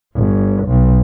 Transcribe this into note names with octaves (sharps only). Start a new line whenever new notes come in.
G1
B1